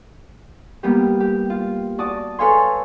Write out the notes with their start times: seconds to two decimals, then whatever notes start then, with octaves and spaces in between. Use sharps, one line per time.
0.83 G3 A#3 B3 G4
1.20 G4
1.50 F4
1.98 F#4 D5 A5 D#6
2.39 A4 B4 C#5 F5 G#5 C6